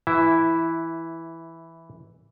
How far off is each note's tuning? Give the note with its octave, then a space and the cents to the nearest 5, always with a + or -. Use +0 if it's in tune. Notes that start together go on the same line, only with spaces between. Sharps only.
E3 +0 E4 +0 E5 -15